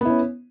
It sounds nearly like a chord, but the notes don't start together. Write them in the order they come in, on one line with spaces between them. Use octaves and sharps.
B3 E4 C#4